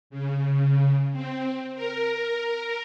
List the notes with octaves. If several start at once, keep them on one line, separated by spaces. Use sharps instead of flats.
C#3
C4
A#4